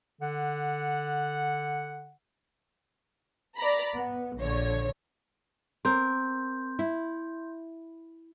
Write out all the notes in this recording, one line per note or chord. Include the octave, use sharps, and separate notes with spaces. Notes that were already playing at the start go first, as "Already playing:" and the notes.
D3 F#5
D5 A#5 B5
B3
A#1 D3 C#5
C4 A#4 C6 G6
E4